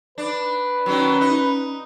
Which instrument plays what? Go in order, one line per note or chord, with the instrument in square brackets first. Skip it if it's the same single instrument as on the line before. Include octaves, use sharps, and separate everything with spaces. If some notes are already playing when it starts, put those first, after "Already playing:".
[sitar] D4 [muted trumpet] B4
[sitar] D#3 F#3 [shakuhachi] C#4
[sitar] D#4